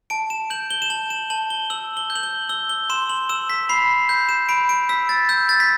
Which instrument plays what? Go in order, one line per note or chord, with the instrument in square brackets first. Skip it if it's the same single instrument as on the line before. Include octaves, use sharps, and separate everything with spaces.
[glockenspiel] A5 D7
E7
G6 F#7
G7
E7
A5 F#7
E7
A5 F#7
G7
E6 F#7
G7
G6
F#7
G7
E6 G7
G7
C6 E7
F#7
E6 E7
B6
B5 C7
G6
E7
B5 D7
D7
E6 B6
A6
E6 G6
A6
B6